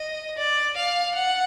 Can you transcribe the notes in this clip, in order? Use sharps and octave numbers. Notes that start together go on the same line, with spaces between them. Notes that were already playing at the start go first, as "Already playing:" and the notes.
Already playing: D#5
D5
F5
F#5